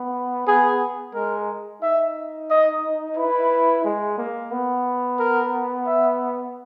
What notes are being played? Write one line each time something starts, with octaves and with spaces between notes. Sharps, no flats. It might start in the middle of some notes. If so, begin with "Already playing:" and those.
Already playing: B3
B3 G#4
G#3 A#4
D#4 E5
D#5
E4 B4
G#3
A#3
B3
A#4
E5